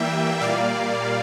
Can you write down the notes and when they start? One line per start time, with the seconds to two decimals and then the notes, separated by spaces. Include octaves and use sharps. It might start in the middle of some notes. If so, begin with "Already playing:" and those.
Already playing: E3 G3 A#3 E5 G5
0.41 A#2 G3 A#3 D5 F5